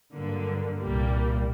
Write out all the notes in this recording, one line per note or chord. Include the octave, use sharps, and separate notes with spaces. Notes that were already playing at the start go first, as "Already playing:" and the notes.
G2 D3 F#3 A#3
C2 A#2 G3 A#3